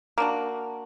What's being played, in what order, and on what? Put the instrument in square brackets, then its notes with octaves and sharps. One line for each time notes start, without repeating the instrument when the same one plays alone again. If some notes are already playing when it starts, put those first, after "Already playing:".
[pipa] A#3 D4 F#4